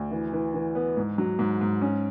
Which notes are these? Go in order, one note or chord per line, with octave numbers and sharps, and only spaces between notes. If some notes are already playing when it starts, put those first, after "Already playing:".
Already playing: D2
E3
E3
E3
B3
G#2
F#3
G#2
G#2
C#4